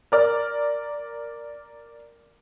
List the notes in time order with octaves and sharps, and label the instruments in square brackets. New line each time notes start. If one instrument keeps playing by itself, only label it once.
[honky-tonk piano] A#4 D5 F6